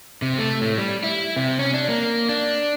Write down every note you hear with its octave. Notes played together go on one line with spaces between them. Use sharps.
C3
A3
A2
G3
E4
C3
C#4
D4
A#3
D4